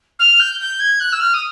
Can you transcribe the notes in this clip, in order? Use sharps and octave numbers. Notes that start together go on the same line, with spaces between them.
F6
G6
G6
G#6
F#6
E6
F6
D#6